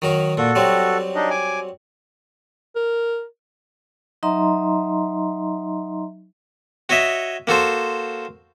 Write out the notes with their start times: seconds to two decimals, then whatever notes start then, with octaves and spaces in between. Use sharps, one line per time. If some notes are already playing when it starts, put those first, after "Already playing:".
0.02 D#3 F#3 A#4
0.37 A#2 F#4 A4
0.55 F#3 G3 C4
1.15 D4 D#4 D#5
1.30 G#5 D6
2.75 A#4
4.23 F#3 D#4 D#5 E5 A#5 C6
6.89 F#4 C#5 D#5 E5
7.47 A#3 F#4 A4 C5